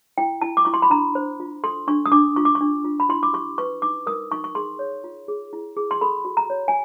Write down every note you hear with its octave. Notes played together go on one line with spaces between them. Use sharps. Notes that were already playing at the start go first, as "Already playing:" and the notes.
E4 G5
E4 A5
D6
E4 C#6
C6
B5
D4 A#5
C5
F4
A4 C6
D4 C#6
D#6
D4 D6
F4 C#6
D6
C#6
D4
F4
B5
E4 C6
D6
G4 C#6
B4 C#6
D#4 D6
A#4 D#6
D#4 C#6
C#6
G#4 C6
C#5
F4
G#4
E4
G#4
C6
A4 B5
F#4
A#5
C#5
G#5